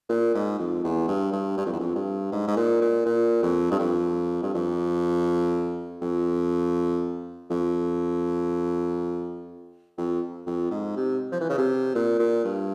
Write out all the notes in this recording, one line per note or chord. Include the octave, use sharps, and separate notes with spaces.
A#2
G#2
F2
E2
G2
G2
G2
F2
E2
F2
G2
G#2
G#2
A#2
A#2
A#2
F2
G2
F2
G2
F2
F2
F2
F2
F2
G#2
C3
F3
E3
C#3
C3
A#2
A#2
G2